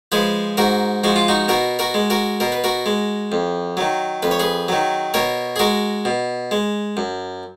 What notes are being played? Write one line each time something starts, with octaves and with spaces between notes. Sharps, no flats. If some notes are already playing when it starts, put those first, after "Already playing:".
F3 G#3 G#4 B4
G#2 F#4 A#4
F3 G#3 F#4
F4
D#4 F#4
B2 F#4 A#4
F#4 A#4
G#3
F#4 A#4
B2 A#4
B4
F#4 A#4
G#3
F2
D#3 F#3
F2 B4
C#5
G#4 B4
D#3 F#3
B2 A#4 C#5
G#4
G#3 F#4 A#4
B2
G#3
F#2